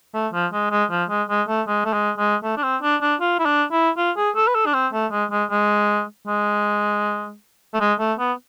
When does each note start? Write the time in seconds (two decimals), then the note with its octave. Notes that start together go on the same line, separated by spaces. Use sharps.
0.14 A3
0.33 F3
0.53 G#3
0.71 G#3
0.91 F3
1.09 G#3
1.29 G#3
1.48 A3
1.67 G#3
1.85 A3
1.93 G#3
2.18 G#3
2.44 A3
2.57 D4
2.63 C4
2.82 D4
3.02 D4
3.21 F4
3.39 E4
3.46 D4
3.72 E4
3.97 F4
4.17 G#4
4.36 A4
4.47 B4
4.55 A4
4.66 D4
4.74 C4
4.93 A3
5.12 G#3
5.31 G#3
5.50 G#3
6.27 G#3
7.74 A3
7.80 G#3
7.99 A3
8.19 B3